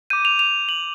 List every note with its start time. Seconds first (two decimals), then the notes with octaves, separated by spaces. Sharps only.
0.10 D6 G6 D#7
0.25 F7
0.39 F7
0.69 F#7